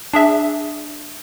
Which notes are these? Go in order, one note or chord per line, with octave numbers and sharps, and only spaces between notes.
D4 G#4 E5